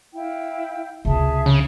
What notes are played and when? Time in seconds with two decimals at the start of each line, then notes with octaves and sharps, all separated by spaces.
0.14 E4 F5 G5
1.05 C#2 C3 G#4 E5 A5
1.46 C#3